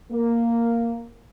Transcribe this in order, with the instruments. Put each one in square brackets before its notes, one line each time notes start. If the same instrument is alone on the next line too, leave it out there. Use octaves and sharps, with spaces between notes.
[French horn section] A#3